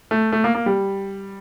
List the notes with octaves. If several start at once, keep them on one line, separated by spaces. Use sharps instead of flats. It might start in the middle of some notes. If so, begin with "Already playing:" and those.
A3
A3
A#3
A#3
G3